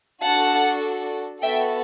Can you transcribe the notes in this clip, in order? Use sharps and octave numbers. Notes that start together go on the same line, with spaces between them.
D4 F#4 A4 F#5 A5
B3 F#4 A4 E5 G5